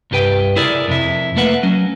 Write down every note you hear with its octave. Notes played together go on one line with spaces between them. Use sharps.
C2 G2 G4 B4 G5
E4 G#4 A#4 D5
F2 C3 E4
A3 A#3 B4 E5 F#5
F#3 C#4